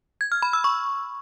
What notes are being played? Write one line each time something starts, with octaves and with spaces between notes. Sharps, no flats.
G#6
F6
B5
E6
C#6